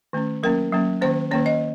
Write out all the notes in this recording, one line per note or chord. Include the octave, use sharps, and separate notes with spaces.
D#3 A3 C#4
F#3 A#3 C#4 A#4
F#3 A#3 C#4
D#3 A#3 C#4 C5
D#3 A#3 C#4 C#5
D#5